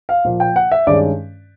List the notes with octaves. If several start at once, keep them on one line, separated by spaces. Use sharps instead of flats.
F5
A#2 F3 A#3
G5
F#5
E5
G2 D#3 G#3 C#4 D5